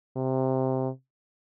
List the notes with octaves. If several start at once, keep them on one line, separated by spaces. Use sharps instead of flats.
C3